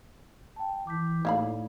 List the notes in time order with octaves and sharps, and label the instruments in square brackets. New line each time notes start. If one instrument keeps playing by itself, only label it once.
[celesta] G5 A5
[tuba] E3 [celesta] D6 G6 B6
[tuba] A2 [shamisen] A#3 F5 B5 [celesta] D#4 D5